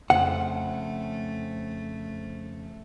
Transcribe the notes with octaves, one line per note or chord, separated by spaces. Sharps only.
F2 C#3 A3 C5 F#5